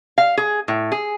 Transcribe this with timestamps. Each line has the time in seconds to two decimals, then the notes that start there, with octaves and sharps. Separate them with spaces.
0.18 F5
0.37 G#4
0.68 A2
0.92 G#4